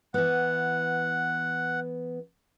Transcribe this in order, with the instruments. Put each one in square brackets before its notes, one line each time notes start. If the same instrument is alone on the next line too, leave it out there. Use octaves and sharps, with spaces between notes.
[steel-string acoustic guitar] E3 B3 [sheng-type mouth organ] F#5